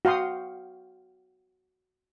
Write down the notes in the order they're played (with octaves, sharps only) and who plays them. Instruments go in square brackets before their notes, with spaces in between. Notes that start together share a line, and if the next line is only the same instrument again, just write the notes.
[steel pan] F#4 F5 G5 C6 D#6